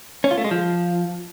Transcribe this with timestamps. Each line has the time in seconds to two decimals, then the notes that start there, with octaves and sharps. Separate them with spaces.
0.24 C#4
0.31 F4
0.38 A3
0.44 G#3
0.51 F3